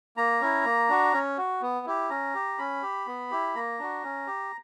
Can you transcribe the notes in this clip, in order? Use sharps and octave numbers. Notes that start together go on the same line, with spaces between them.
A#3 A#5
C#4 E4
A#3
D4 F#4
C#4
F#4
B3
E4 G4
C#4 A#5
G4
C#4 B5
G4
B3
E4 G4
A#3 A#5
D4 F#4
C#4
G4